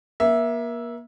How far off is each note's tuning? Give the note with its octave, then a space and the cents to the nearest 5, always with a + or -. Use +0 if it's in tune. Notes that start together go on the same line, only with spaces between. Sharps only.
A#3 +35 E5 +0